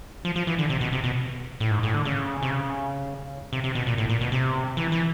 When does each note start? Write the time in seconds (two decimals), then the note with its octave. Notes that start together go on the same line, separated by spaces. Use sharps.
0.25 F3
0.36 F3
0.47 E3
0.58 D3
0.70 C3
0.81 B2
0.92 C3
1.04 B2
1.60 A2
1.71 G#2
1.83 A2
1.94 D3
2.05 C#3
2.43 C3
2.51 C#3
3.53 C3
3.64 C3
3.75 B2
3.87 A#2
3.98 A2
4.09 A#2
4.21 B2
4.32 C3
4.77 E3
4.92 E3